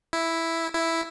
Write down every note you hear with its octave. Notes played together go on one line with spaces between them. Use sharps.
E4
E4